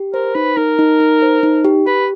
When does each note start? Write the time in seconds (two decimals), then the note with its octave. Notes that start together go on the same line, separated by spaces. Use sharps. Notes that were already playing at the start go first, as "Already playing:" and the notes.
Already playing: G4
0.14 A#4 C5
0.35 D#4 B4
0.57 D#4 A#4
0.79 D#4
1.00 D#4
1.22 C5
1.43 D#4
1.64 G4
1.87 G4 B4